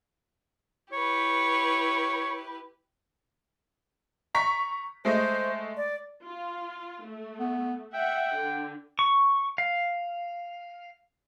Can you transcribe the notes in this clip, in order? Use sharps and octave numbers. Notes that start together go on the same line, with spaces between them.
E4 G4 B4 C#5
A#5 C#6 B6
G#3 A3 C5 D#5
D5
F4
A3
B3
E5 F#5 G5
D3
C#6
F5